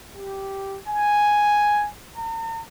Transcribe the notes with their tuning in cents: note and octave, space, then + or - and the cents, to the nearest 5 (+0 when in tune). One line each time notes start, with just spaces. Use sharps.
G4 -5
G#5 +0
A#5 -45